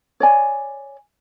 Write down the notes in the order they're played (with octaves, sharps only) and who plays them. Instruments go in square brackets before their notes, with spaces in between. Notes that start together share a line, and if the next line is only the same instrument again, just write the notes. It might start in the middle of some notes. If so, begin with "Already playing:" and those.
[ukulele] C#5 D5 G#5